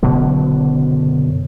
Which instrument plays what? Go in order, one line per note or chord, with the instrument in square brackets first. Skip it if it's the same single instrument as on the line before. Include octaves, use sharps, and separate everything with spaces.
[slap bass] F#1 B2 D3 F#3